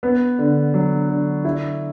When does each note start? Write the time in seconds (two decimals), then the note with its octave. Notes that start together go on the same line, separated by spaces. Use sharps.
0.03 B3
0.39 D3
0.74 F#3
1.09 D3
1.45 E4